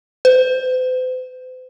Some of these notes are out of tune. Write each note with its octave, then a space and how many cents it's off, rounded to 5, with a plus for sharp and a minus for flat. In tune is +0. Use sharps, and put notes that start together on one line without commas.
C5 -45